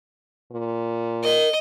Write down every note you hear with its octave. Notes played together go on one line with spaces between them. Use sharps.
A#2
A#4 D#5